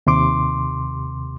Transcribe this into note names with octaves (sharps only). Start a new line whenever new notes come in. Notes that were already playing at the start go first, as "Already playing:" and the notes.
D#2 C3 C6 D6